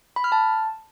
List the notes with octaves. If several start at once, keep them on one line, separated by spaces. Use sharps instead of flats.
B5
F6
A5